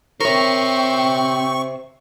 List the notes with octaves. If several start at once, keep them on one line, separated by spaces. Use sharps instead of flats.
C4 A#4 C5 C#5 E5 C#6